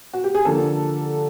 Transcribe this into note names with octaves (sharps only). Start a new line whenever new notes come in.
F#4
G4
G#4
D3 F3 A#3 A4